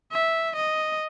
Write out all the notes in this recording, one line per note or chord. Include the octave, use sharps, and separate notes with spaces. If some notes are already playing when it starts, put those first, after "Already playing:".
E5
D#5